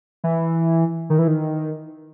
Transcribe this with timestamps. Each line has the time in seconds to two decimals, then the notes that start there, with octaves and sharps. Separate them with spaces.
0.24 E3
1.10 D#3
1.19 E3
1.28 D#3